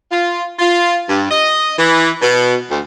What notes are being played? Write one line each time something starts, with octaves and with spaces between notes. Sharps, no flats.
F4
F4
G2
D#5
E3
B2
D2